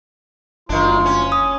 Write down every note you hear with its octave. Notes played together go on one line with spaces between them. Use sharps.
F#1 D2 D#3 D4 F4
C#4
D#6